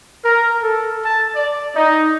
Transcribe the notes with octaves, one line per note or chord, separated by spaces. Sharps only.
A#4
A4
A5
D5
D#4